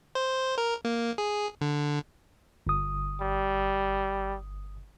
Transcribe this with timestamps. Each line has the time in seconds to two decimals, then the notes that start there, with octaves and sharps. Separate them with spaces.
0.15 C5
0.58 A#4
0.85 A#3
1.18 G#4
1.61 D3
2.67 G1 D#6
3.21 G3